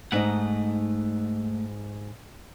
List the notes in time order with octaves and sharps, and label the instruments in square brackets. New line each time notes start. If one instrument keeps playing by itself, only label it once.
[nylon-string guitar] G#2 D#4 D#5 [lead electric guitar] A3 F#5